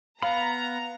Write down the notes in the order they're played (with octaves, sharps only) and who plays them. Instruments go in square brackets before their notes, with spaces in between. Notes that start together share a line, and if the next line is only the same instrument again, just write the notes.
[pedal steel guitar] B3 B5 [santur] F5 [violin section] A#5